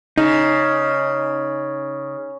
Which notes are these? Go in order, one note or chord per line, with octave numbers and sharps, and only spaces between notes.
C#3 D#4